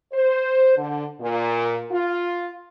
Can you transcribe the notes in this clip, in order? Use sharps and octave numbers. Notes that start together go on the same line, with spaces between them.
C5
D3
A#2
F4